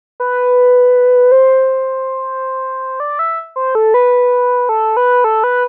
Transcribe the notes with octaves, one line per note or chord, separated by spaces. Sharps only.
B4
C5
D5
E5
C5
A4
B4
A4
B4
A4
B4